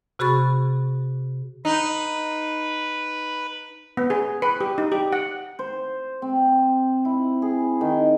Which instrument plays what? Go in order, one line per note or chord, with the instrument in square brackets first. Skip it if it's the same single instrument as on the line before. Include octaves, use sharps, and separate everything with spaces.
[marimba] C3 F#4 G#4 B5 C#6 A6
[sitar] D#4 [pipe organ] B4
[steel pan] B3
G#4
B4
G4
D#4
G4
F#5
[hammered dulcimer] C5
C4
E4
G#4
D#3